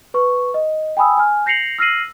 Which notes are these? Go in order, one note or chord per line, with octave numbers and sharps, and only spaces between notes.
B4 C#6
D#5
G5 G#5 B5 D#6 E6
G#5 F6
G6 A#6 C7 C#7 F7 F#7
E6 F6 A#6 C7 D#7 F#7